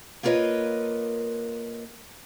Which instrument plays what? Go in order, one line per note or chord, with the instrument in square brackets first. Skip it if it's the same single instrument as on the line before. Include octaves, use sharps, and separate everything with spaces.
[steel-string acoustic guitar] A#3 F4 A#4 B4 C#5 D#5